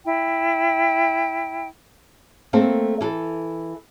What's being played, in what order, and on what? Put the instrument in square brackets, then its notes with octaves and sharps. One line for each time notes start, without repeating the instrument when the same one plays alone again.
[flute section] E4 G5
[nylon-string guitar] A3 A#3 C4 A4
E3 A4